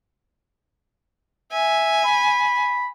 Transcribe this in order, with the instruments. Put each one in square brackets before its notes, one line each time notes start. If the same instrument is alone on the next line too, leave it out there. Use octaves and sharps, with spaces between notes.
[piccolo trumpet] E5 [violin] G#5
[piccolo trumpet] B5